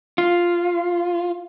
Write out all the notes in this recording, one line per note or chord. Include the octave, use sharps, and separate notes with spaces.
F4